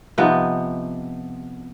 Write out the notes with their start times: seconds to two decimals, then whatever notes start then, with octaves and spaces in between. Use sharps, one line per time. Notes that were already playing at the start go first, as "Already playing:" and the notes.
0.18 C3 F3 B3 D#4